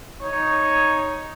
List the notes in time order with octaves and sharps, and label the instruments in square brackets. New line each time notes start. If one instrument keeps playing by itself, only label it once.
[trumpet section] D#4 C#5